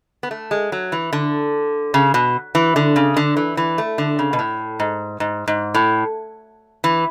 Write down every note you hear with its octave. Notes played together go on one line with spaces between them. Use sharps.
B3
A3
G#3
F#3
E3
D3
C#3
B2
E3
D3
C#3
D3
E3
E3
A3
D3
C#3
B2
A2
G#2
G#2
G#2
A2
E3